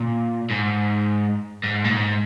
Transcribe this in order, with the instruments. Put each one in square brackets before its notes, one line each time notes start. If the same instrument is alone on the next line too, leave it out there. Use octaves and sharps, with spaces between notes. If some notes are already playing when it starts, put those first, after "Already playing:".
Already playing: [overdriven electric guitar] A#2
G#2
G#2
A#2
G#2